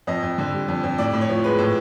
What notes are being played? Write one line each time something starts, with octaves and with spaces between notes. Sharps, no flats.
F2 D#5
F2
D3
G3
F2
F2
A2 D5
A2
C#5
F3
G#3 B4
A2